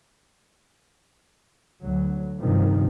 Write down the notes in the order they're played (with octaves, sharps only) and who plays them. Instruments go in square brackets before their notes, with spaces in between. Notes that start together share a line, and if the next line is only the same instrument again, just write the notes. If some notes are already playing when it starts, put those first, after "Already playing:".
[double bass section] D2 F#3
G2 C3 D#3 F3